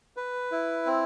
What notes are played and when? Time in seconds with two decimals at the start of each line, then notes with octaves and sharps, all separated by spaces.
0.17 B4
0.52 E4
0.86 C4